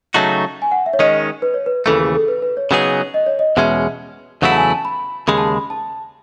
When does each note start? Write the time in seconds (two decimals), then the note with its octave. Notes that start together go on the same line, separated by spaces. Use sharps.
0.14 C#3 F#3 A3 D#4 F#4 A5
0.62 G#5
0.71 F#5
0.86 E5
0.93 C#5
0.99 D#3 G#3 C#4 D#5
1.42 B4
1.54 C#5
1.66 B4
1.86 D#2 C#3 E3 A3 A4
2.00 G#4
2.15 A4
2.28 B4
2.42 B4
2.57 C#5
2.71 C#3 F#3 B3 D#4 G#4 C#5
3.14 D#5
3.26 C#5
3.39 D#5
3.57 E2 B2 G#3 C#4 E5
4.42 E2 C#3 F#3 A3 E4 F#5
4.52 A5
4.57 G#5
4.71 A5
4.85 B5
5.28 D#2 C#3 G#3 B5
5.38 A5
5.48 B5
5.70 A5